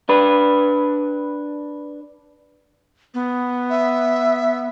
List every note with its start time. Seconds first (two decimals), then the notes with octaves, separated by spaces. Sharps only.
0.09 D4 B4
3.14 B3
3.70 E5